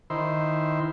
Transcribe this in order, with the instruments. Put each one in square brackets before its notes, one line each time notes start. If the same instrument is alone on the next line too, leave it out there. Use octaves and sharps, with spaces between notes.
[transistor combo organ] D#3 E4 C5